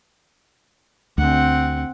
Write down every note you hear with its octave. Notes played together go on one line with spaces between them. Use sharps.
D2 C4 F#5